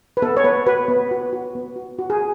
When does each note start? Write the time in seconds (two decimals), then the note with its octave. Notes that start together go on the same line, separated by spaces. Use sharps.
0.17 B4
0.22 B3 A4
0.37 C#5
0.44 B3 B4
0.66 F#4 B4
0.88 B3
1.11 F#4
1.33 F#4
1.55 B3
1.76 F#4
1.98 F#4
2.10 G#4